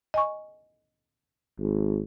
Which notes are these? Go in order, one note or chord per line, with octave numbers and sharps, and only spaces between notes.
D#5 G#5 C#6
G#1